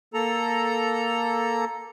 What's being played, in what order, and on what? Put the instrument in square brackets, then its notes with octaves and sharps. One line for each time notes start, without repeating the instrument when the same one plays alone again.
[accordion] A#3 A4 A#5